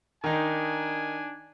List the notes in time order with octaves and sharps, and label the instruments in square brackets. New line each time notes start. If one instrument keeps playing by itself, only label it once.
[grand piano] D#3 D#4 [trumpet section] D4 G#5